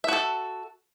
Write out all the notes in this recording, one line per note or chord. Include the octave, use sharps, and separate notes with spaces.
F#4 A4 E5